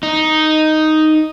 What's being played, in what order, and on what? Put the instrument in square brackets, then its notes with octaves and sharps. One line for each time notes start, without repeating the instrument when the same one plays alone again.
[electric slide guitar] D#4